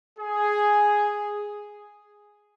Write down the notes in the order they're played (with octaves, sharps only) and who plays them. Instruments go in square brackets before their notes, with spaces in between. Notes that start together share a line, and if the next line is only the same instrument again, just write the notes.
[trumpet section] G#4